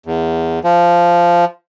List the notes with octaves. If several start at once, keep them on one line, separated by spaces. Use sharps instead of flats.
E2
F3